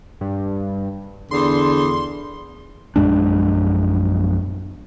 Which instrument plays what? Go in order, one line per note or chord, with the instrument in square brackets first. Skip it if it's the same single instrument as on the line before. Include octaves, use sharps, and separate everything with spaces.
[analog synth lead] G2
[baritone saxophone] E2 [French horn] D3 [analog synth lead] C6
[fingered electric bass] A#1 F#2 G#3 D4